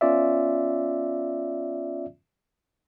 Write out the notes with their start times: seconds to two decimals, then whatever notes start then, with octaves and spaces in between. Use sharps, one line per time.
0.01 B3 C#4 F4 D5 E5